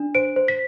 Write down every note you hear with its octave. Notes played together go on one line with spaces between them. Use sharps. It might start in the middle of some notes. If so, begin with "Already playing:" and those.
Already playing: D4
C5 D7
C5
B6